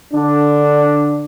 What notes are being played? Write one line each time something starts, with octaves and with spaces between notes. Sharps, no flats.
D3 D4